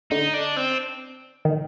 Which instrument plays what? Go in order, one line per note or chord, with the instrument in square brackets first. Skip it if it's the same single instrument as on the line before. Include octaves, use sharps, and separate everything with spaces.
[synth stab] D3 [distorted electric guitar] D#4
[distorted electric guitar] D4
C4
[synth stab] D#3